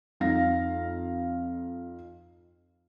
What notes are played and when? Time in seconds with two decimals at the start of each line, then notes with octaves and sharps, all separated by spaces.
0.20 F2 D#4 F5 A#6